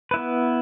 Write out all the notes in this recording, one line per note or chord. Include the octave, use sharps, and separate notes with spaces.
B3 E4 B4